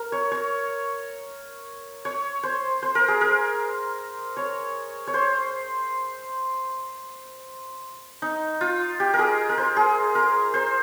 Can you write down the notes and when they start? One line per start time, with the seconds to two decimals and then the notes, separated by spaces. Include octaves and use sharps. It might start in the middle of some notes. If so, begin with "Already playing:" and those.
Already playing: A#4
0.12 C#5
0.31 C#5
2.05 C#5
2.43 C5
2.82 C5
2.95 A#4
3.08 G#4
3.21 A#4
4.37 C#5
5.07 C#5
5.14 C5
8.22 D#4
8.61 F4
9.00 G4
9.14 A#4
9.19 G#4
9.49 A#4
9.57 C5
9.77 G#4
10.15 A#4
10.54 C5